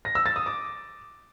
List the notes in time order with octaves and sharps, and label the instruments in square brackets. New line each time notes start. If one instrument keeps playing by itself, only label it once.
[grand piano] A#6
E6
A6
D#6
D6